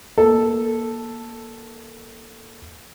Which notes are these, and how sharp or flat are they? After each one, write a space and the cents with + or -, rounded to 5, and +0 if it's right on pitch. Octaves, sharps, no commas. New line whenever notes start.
A#3 +25 A4 +0